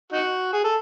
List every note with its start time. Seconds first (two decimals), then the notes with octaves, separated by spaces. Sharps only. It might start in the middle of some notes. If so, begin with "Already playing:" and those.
0.12 D#4 F#4
0.53 G#4
0.64 A4